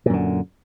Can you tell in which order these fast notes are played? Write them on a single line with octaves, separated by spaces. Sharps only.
A#2 F#2 D3